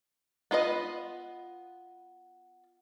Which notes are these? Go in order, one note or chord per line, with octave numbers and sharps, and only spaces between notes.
B3 F4 B4 D#5